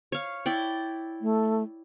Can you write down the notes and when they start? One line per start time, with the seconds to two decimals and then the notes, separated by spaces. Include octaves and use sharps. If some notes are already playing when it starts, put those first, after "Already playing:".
0.12 C#5 F5
0.46 E4 D5 G5
1.21 A3